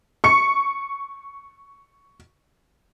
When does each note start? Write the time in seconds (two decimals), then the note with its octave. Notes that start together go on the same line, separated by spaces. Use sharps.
0.24 C#6 C#7